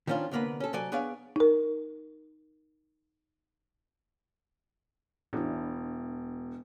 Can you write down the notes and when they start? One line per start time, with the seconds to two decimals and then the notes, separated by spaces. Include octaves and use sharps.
0.07 D#3 F3 C#4 D4 F4
0.31 C2 D3 A#3 B3 B4
0.60 C#4 A4
0.73 C3 F#3 A4 D5 G#5
0.92 B3 D4 G#4 C#5 D5 F5
1.36 D#4 A#4
5.33 E1 D4 E4